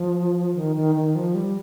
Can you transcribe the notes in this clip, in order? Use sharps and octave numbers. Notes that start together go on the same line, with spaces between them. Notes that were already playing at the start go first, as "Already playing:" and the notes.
Already playing: F3
D#3
D#3
D#3
F3
G3